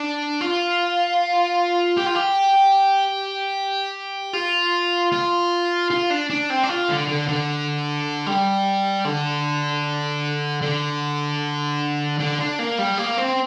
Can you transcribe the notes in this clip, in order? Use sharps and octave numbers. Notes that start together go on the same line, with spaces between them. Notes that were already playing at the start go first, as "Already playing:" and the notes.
Already playing: D4
F4
G4
F4
G4
F4
F4
F4
D4
D4
C4
D4
F4
D3
D3
D3
G3
D3
D3
D3
D4
A#3
G3
A#3
C4